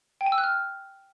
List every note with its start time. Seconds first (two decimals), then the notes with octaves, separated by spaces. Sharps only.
0.21 G5
0.26 G#5
0.32 E6
0.38 F#6
0.44 F6